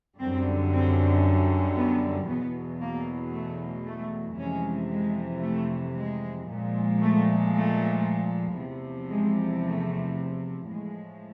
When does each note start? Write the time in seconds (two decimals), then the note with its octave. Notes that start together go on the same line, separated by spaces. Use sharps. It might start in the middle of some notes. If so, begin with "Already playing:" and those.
0.18 F#2 D3 G3 C4
0.71 C4
1.76 B3
2.28 E2 B2 F#3 B3
2.81 A#3
3.33 A3
3.86 A3
4.37 F2 C3 E3 G#3 C#4
4.90 G#3
5.42 A3
5.96 G#3
6.47 A#2 F3 G#3
7.01 A3
7.53 A3
8.57 E2 C3 F3
9.09 G#3
9.62 A3
10.67 A2 F3 G#3